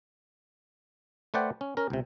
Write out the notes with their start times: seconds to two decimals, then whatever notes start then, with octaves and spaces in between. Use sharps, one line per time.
1.34 A3 B4 C5 D5 F#5 G5
1.61 C#4
1.77 C#4 A#4
1.90 C#2 C3